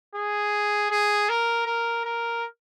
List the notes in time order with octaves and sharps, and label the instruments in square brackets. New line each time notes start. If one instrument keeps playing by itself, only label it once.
[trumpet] G#4
G#4
A#4
A#4
A#4